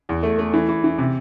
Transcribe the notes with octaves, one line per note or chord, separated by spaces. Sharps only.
E2
A3
A3
E3
E3
E3
C3